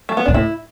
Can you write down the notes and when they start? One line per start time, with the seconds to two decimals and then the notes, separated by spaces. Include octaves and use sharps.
0.09 A3
0.17 B3
0.26 B2 D4
0.34 A2 E4